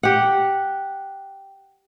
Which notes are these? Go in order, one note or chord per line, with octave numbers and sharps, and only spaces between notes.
G4 F#5